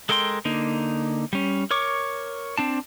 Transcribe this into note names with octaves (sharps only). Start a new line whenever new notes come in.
G#3 A4 A#4 G5 C6
D3 A#3 D#4
G3 C#4
A#4 C#5 C#6 D6
C4 D4 A5